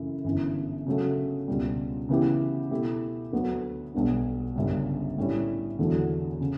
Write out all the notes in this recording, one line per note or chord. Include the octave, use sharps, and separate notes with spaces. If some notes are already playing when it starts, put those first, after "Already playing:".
Already playing: F#2 C#3 E3 A3 E4
G1 F#2 E3
C#3 F#3 A3
C#2 B2 G3
C#3 E3 B3 E4 G4
B2 A3 E4 G4
D2 D3 F#3 B3 F#4
B1 B2 G3 B3 D4
G1 F#2 C#3 G3
A2 G3 C#4 E4
E1 E2 D3 F#3 A3
C#3